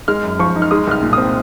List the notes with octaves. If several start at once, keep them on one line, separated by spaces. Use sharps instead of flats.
G#3 F6
F#2
F3 C#6
D#4
F6
G#3 D#6
C2 F6
A#2
C4 D#6